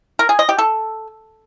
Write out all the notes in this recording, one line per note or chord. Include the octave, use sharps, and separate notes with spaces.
A#4
G#4
D#5
G4
A4